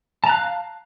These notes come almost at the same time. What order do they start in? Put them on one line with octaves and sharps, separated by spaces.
A5 A#5 F#6 F5